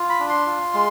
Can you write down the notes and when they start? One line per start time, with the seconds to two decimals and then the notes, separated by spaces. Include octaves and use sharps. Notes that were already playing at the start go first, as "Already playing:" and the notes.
Already playing: F4
0.10 B5
0.20 D4
0.29 C6
0.47 F4
0.74 G#3